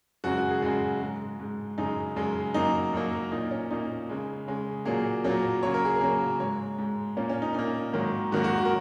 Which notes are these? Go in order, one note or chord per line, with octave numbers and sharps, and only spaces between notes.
F#2 C#3 G#3 F#4
F#4
G#4
F#2 C#3 G#3 F#4
G#2 G#3
G#2 G#3
F#2 C#3 G#3 D#4
F#2 C#3 G#3
F#2 F#3 A#3 D#4
F#2 F#3 A#3
A#2 A#3 D#4
C#4
A#2 A#3 D#4
C#3 G#3
C#3 G#3
A#2 F#3 A#3 G#4
A#2 F#3 A#3
C#3 F#3 A#3 C#5
A#4
G#4
A#4
C#3 F#3 A#3
G#2 G#3 C#5
G#2 G#3
A#2 A#3 C#4
C#4
D#4
A#2 A#3 D#4
G#2 D#3 F#3 A#3
G#2 D#3 F#3 A#3 F#4
F#4
F#4
A#4